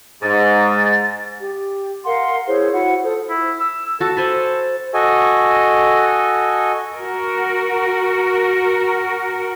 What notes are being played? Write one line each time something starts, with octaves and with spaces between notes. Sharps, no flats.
G#2 A6
G4
A#4 F5 F#5 C6
E4 G#4 C5 C#5
E4 F#4 F#5 B5
F4 A4 C5 D#6
E4
E6
F#4 A4 A5
A4 C5 G#5 B5
F#4 A4 D#5 G#5
F#4 A#4